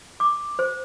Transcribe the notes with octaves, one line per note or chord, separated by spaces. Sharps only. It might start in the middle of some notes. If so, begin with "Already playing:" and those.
D6
C5